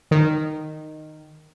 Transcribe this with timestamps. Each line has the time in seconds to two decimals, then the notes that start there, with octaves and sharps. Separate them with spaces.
0.11 D#3